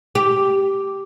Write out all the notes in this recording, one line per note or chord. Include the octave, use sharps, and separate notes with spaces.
G4